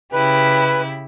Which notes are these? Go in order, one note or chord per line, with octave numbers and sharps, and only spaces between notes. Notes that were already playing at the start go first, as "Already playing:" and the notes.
C#3 E4 G4 B4